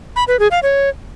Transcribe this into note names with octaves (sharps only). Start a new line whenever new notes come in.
B5
B4
G#4
F5
C#5